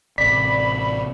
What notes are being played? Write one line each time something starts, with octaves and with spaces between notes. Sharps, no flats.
A1 C3 D5 B5 B6